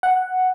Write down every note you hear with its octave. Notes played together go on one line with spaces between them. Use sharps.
F#5